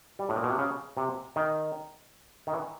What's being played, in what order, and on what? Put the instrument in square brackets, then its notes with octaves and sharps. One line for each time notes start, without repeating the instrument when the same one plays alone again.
[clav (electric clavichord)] G3
A2
A#2
B2
C3
C#3
C3
D#3
D#3
E3